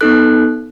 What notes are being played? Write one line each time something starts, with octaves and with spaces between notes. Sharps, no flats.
B3 D#4 A4 F#6